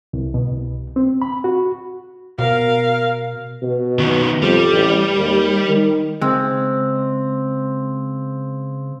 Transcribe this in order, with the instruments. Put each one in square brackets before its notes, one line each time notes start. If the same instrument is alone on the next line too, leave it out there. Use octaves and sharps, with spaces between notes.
[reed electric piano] C2
B2
C2
C4
B5
F#4
[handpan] B2 [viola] A#4 F5
[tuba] B2
[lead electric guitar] D#3 B3
[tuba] F2 [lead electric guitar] G3
[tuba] A1
D#2
D#3
[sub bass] C#3 [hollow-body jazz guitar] G#3 [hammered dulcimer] C4